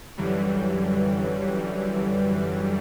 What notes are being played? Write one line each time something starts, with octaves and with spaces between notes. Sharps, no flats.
F#2 D3 E3 F#3 G3